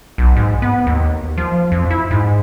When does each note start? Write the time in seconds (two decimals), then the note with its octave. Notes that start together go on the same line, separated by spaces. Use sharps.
0.18 B1
0.36 G#2
0.62 B3
0.87 D#2
1.38 F3
1.72 F2
1.91 E4
2.11 G#2